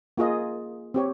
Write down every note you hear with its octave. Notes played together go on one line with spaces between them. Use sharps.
A#3 F4 G#4 D#5
C4 G4 C#5